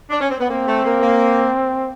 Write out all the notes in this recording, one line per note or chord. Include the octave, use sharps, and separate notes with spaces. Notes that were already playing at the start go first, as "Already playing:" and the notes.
D4
C#4
C4
B3
A#3 C4
A3
A#3
A#3